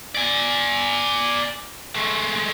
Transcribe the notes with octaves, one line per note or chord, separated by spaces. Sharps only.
D5 G#5
G#3 A3